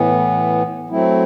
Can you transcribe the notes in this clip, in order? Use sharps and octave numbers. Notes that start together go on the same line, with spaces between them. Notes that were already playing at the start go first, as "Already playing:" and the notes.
Already playing: A2 E3 B3
F#3 A3 C4 E4